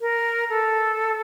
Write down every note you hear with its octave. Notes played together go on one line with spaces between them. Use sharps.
A#4
A4